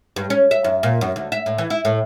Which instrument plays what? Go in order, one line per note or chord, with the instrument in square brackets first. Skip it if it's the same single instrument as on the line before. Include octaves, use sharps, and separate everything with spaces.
[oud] G2
C#4
E5
F#2
A#2
F#2
D2
E5
A2
E3
E4
A2